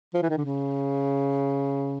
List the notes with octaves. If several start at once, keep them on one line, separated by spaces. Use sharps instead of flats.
F3
E3
D#3
D3
C#3